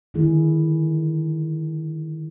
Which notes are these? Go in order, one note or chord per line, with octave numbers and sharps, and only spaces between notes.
D3 D#3 G#3 E4 G#4